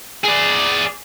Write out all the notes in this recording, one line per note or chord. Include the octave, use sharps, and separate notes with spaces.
G#4 D5